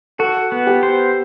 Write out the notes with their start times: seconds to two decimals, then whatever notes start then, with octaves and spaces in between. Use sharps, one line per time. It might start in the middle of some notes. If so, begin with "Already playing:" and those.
0.19 F#4 A4
0.52 B3
0.67 G4
0.83 C5